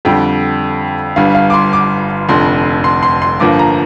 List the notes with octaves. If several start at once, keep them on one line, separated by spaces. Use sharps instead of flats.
F2 D3 G3 G5
G1 G2 G3 F5
F5
D6
C6
D6
F1 F2 D3 C6
C6
C6
C6
G1 G2 F3 A#3 D6
A#5